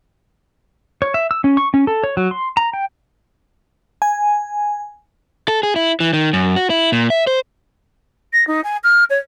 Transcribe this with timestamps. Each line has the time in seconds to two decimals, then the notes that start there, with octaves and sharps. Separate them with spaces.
1.02 C#5
1.14 E5
1.31 E6
1.44 C#4
1.57 C#6
1.74 C#4
1.87 A4
2.04 C#5
2.17 F#3
2.31 C6
2.57 A#5
2.73 G5
4.02 G#5
5.48 A4
5.63 G#4
5.76 E4
6.00 E3
6.13 D#3
6.33 F#2
6.56 F#4
6.70 E4
6.92 A#2
7.10 E5
7.27 C5
8.33 A#6
8.47 D#4
8.64 G#5
8.84 F6
9.10 C#5